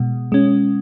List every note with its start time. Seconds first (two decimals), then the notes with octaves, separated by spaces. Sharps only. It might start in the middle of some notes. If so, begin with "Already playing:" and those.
Already playing: B2 G#3
0.32 G#3 C#4